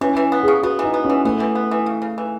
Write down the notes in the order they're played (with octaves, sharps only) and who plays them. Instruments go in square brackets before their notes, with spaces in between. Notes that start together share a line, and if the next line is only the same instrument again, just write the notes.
[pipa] E3 [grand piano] C#4
[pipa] E3
B3
[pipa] C#3 [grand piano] G#4
[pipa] B3 [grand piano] F#4
[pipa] E3 [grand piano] D#4
[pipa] B3
[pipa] E3 [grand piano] C#4
[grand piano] A3 [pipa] B3
[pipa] E3
B3
E3
C#3
C#3
E3